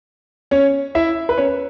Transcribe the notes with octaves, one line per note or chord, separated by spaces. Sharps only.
C#4 C#5
E4 E5
B4
C#4 C#5